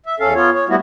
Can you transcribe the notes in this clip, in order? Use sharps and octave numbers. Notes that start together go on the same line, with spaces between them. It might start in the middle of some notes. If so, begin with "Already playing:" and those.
E5
E2 C#4 A4 F5
B3 F4 C#5
C#5
F#2 G3 A3 B3 E4 F#4